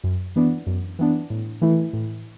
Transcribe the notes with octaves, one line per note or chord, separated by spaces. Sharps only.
F#2
E3 B3 D4
F#2
E3 B3 D4
A2
E3 A3 E4
A2